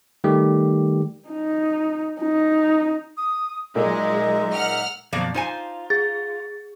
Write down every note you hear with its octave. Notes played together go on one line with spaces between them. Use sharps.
D#3 G3 A3 G4
D#4
D#4
D#6
A#2 F#3 G#3 A#3 D#4 D#5 E5
F#5 F6
F#2 B2 F3 F#3 A#3 D5
D#4 F4 C5 G#5
G#4 A6